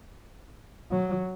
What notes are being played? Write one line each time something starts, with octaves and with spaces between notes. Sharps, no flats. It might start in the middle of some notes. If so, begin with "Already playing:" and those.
F#3